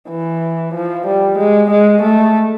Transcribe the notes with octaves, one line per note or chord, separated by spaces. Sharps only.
E3
F3
G3
G#3
G#3
A3